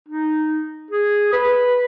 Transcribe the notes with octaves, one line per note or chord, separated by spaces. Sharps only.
D#4
G#4
B4